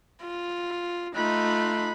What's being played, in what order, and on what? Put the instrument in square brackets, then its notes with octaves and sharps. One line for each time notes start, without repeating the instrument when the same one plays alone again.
[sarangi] F4
[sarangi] A3 [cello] D#4 F4 [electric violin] B5 F#6